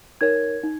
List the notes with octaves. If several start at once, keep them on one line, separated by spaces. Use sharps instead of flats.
D#4 A#4 C#5 G#6
D#4